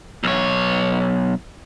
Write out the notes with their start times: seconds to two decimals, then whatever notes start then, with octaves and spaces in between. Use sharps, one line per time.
0.23 B1 C#5